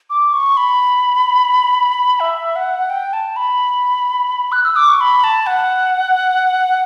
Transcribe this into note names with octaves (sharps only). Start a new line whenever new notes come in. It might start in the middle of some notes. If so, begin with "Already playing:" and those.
D6
C#6
B5
E5
F#5
G5
A5
B5
F#6
E6
D6
C#6
B5
A5
F#5